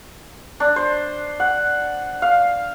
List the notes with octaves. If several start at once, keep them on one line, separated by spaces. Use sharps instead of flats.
D4
C5
F#5
F5